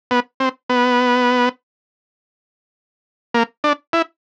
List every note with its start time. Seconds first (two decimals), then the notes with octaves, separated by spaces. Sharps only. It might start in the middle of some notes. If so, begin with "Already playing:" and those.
0.11 B3
0.40 C4
0.69 B3
3.34 A#3
3.64 D4
3.93 E4